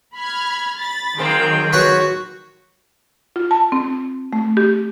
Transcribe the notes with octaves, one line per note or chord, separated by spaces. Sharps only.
B5 F6 G#6
B5 A6
D#3 F#3 G#3 A#3 C4 G5
F#4 B4 C#5 F#5
F4
A5
C4
A3
G4